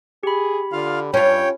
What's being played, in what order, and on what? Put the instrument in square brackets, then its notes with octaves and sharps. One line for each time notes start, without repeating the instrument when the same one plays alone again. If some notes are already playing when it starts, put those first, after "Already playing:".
[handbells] G4 B5 [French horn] G#4
[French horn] D3 [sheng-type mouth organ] F4 F5
[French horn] G2 [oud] C#4 F4 [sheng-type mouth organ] C#5 G5